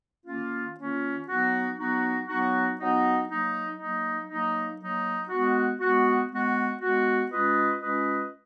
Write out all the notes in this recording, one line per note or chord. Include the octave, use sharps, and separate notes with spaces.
D#3 A#3 C#4 F4
D#3 A#3 C#4 F4
F#3 B3 D#4 F#4
F#3 B3 D#4 F#4
F#3 B3 D#4 F#4
F#3 B3 D#4 F#4
F#3 A#3 D#4
F#3 A#3 D#4
F#3 A#3 D#4
F#3 A#3 D#4
G#3 B3 F#4
G#3 B3 F#4
G#3 B3 F#4
G#3 B3 F#4
G#3 C#4 F4 B4 D#5
G#3 C#4 F4 B4 D#5